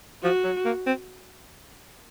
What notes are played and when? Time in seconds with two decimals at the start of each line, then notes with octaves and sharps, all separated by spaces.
0.23 F3 F#4
0.44 F#3
0.65 A#3
0.86 C4